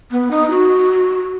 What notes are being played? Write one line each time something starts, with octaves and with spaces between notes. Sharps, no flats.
B3
D#4
F#4